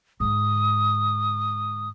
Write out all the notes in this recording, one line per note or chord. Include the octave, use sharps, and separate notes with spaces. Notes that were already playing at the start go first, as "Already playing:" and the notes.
G#2 D3 D#6